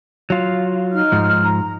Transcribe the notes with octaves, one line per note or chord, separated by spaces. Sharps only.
F#3 F4
D#4 F6
G#2 F3
A#5